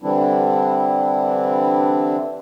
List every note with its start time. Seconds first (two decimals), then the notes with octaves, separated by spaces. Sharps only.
0.02 D3 E3 G3 C4 D4 E4